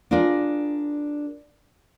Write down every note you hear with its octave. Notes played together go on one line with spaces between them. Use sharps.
D4 F4 G#4 A#4 D5